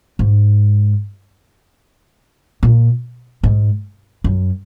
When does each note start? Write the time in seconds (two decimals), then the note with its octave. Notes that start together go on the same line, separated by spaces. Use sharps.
0.19 G#2
2.63 A#2
3.43 G#2
4.24 F#2